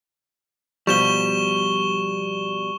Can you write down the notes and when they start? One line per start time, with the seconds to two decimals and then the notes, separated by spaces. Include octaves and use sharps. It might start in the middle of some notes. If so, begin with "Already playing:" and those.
0.87 B2 F3 G3 C#6 E7 G7